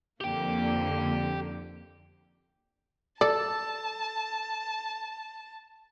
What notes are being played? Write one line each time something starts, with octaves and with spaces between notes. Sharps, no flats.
F2 D3 A#3 G4 G5
A4 D5 A5